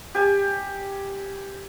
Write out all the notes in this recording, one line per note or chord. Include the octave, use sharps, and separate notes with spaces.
G4 G#5